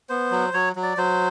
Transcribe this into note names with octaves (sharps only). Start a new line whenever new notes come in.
B3 C5
F#3
F#3 C#5
F#3
D5
F#3 C5